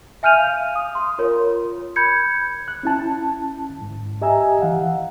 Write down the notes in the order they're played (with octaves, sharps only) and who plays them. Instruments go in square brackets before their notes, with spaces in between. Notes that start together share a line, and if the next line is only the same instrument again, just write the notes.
[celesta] E5 G#5 F6 G6 D#7 F7
F5
D#6
C6
F4 A#4 C#5
B5 G6 G#6 C#7
[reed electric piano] F#6
C#4 E4 A5
G#2
G4 D#5 E5 G#5 A#5 E6
E3 F5 F#5